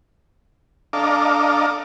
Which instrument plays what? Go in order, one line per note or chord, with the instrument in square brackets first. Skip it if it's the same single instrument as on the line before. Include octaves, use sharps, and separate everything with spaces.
[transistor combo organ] D4 A4 D#5 F5 A#5 D6